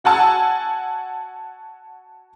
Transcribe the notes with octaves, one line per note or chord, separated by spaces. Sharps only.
F#4 F#5 G#5 A5 E6